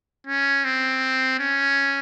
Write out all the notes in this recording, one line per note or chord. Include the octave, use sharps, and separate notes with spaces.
C#4
C4
C#4